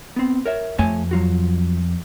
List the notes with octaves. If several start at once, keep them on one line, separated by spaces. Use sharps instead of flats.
B3 C4
A#4 C#5 E5
F2 A3 C#5 G#5
F#3 F4 F#4